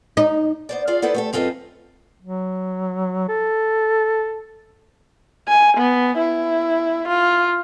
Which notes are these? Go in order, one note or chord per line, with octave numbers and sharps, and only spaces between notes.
D#4
B3 C5 D5
F4 G#4 D5 F5
B3 E4 A4 B4 C5 D5
A3 G4 A4
F#2 C4 F4 A4 B4 D#5
F#3
A4
G#5
B3
E4
F4